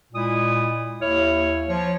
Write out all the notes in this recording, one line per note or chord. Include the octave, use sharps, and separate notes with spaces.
A#2 G#3 E4 D#6
D#2 E4 C#5 F6
F3 C#5